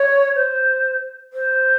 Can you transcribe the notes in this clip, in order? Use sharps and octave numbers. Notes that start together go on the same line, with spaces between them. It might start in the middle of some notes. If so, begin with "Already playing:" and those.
Already playing: C#5
C5
C5